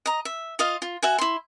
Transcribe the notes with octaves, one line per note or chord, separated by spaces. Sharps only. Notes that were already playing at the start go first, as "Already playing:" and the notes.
D#5 A#5
E5
F4 D#5 F5
F4
F#4 E5 G#5
E4 C6